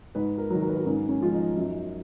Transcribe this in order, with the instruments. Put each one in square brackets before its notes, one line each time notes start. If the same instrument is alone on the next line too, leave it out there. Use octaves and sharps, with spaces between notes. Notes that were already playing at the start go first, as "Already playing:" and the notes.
[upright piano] G#2 B4
A#4
D#3 F#3
A#4
B4
A#4
G#2 C#4
C#4
F3 G#3 F4
D#4
F#2